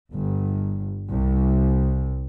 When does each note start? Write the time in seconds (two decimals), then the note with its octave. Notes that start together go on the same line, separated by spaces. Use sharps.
0.13 G1
1.09 C2